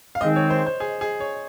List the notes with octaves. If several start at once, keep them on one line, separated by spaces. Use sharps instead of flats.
F5
D#3 G#3 C4 D#5
C#5
C5
C5
G#4
G#4
C#5